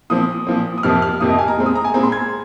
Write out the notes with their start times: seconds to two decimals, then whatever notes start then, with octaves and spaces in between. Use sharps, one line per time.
0.10 A#2 F3 C4 D#6
0.47 A#2 F3 C4
0.78 D#6
0.83 F2 C3 F3 A#3 F6
1.02 F6
1.20 F2 C3 F3 A#3 D#6
1.30 D#5
1.38 G#5
1.48 A#5
1.57 A#2 G#3 C4
1.66 D#6
1.76 A#5
1.85 G#5
1.94 A#2 G#3 C4 A#5
2.03 C6
2.12 G#6